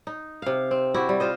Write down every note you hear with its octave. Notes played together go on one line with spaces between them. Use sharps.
D#4
C3 F5
C4
E4 F#4 G4
G3
F4 C5 D#5